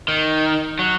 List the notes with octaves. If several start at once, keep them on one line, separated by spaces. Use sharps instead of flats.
D#3
F#3